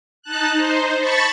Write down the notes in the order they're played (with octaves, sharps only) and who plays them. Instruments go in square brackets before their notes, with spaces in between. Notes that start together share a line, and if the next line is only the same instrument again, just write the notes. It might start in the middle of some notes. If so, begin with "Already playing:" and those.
[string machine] D#4 A5 F#6
D#4 C5
A5 B5 C#6 A6